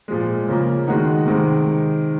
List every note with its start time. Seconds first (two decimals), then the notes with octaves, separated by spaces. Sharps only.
0.08 A#2 F3 G#3
0.48 C#3 F3 A#3
0.88 D#3 G#3 D#4 F#4
1.26 C3 D#3 G#3